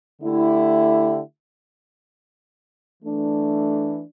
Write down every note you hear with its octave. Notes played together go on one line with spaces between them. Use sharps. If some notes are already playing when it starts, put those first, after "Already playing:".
D3 A3 E4 G4
E3 A3 D4